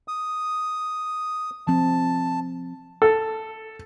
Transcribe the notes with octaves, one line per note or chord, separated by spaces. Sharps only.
D#6
F3 C4 A5
A4